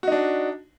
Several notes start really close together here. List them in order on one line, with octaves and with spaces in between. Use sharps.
F#4 D#4 D4